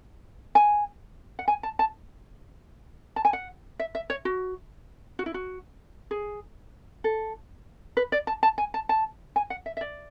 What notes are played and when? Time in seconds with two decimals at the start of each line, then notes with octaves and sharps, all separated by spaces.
0.55 G#5
1.39 F#5
1.48 G#5
1.63 A5
1.79 A5
3.16 A5
3.25 G#5
3.33 F#5
3.79 E5
3.95 E5
4.10 C#5
4.25 F#4
5.19 F#4
5.26 E4
5.34 F#4
6.11 G#4
7.04 A4
7.97 B4
8.12 D5
8.27 A5
8.43 A5
8.58 G#5
8.74 A5
8.89 A5
9.36 G#5
9.50 F#5
9.66 E5
9.77 E5
9.81 D5